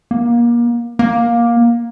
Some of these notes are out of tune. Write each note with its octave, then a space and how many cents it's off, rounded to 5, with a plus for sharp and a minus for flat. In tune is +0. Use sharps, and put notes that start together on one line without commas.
A#3 +30
A#3 +15